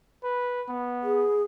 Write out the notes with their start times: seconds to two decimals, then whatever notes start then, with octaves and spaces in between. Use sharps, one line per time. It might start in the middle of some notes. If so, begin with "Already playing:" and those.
0.23 B4
0.69 B3
1.03 G#4